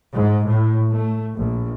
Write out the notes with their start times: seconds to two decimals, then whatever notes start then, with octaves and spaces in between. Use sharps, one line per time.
0.12 G#2
0.45 A2
0.90 A3
1.36 A#1